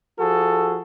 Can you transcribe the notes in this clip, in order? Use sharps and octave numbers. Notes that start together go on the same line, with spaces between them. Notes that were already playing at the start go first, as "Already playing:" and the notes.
F3 F#4 G#4 A4